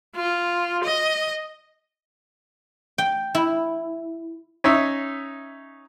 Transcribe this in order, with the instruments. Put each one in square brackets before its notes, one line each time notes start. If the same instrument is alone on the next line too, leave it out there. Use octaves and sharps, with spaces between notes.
[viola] F4
D#5
[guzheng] G5
E4
[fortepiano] C#4 D#4 E5